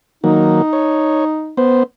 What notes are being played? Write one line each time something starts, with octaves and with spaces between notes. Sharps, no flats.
D#3 F#3 A#3 D#4
C#5
B3 C5